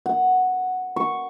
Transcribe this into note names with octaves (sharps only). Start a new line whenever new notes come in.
F#5
C#6